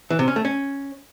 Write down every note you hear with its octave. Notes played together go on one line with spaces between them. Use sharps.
E3
C3
C#4
A3
C#4